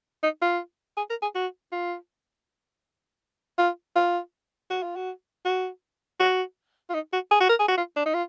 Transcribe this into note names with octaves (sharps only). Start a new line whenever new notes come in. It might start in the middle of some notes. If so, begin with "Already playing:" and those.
D#4
F4
G#4
A#4
G#4
F#4
F4
F4
F4
F#4
F4
F#4
F#4
F#4
F4
D#4
F#4
G#4
F#4
A#4
G#4
F#4
F4
D4
D#4
F4